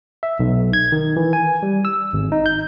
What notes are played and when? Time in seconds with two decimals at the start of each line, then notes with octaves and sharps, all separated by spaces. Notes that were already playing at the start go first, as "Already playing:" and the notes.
0.23 E5
0.39 B1
0.73 G#6
0.92 D#3
1.16 E3
1.33 G#5
1.63 G3
1.85 E6
2.13 G#1
2.32 D#4
2.46 G6